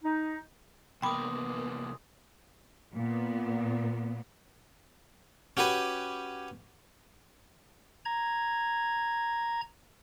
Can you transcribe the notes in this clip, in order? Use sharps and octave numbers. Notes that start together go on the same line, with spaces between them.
D#4
C2 A#3 B3 G5 B5 C6 D6 D#6
A#2 B3
C#4 F#4 G4 B4 G#5
A#5 G#6